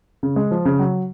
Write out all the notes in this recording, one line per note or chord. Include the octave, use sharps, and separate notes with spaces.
C#3
G#3
F3
C#3
F#3